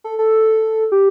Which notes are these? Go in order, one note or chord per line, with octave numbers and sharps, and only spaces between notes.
A4
A4
G4